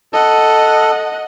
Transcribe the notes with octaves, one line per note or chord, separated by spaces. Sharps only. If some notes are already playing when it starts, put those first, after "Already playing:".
A4 D#5 F#5